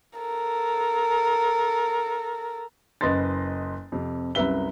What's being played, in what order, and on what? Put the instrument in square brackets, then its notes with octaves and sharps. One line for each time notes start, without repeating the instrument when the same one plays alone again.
[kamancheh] A4 A#4
[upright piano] F#1 B4 D#5 C6 A6
F2 C3
C2 F#2 B4 E5 G7